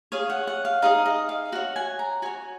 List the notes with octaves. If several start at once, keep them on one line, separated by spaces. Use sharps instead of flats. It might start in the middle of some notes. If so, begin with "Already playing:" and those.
G#4 C#5 F5
F#5
F#5
F5
D#4 G#4 D#5 F5
D#5
F5
F#4 C#5 F#5
G#5
A#5
F#4 C#5 G#5